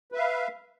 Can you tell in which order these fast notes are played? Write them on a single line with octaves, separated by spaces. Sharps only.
B4 E5 F5